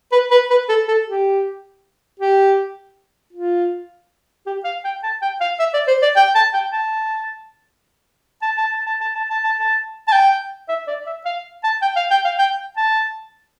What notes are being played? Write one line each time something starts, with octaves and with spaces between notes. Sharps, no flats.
B4
B4
B4
A4
A4
G4
G4
F4
G4
F5
G5
A5
G5
F5
E5
D5
C5
D5
G5
A5
G5
A5
A5
A5
A5
A5
A5
A5
A5
A5
A5
A5
G5
E5
D5
E5
F5
A5
G5
F5
G5
F5
G5
A5